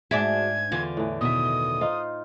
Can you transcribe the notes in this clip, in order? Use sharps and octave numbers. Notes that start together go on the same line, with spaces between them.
G#2 D4 F#4 G#4 E5 G#6
E2 D3 F4
A2 E3
B2 D#3 E5 D#6
D#4 F4 C5